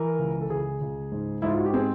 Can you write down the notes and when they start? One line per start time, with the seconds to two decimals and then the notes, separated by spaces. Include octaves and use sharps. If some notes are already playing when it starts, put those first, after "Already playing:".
Already playing: E3 A#4
0.19 C#2
0.41 A4
0.49 C#2 G#4
0.81 C#2
1.12 G#2
1.42 G#2 E4
1.50 F4
1.58 F#4
1.66 G4
1.73 C4 G#4